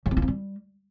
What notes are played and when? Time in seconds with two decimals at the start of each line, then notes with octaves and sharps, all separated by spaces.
0.06 F#3
0.11 C4
0.17 F4
0.22 C4
0.28 G3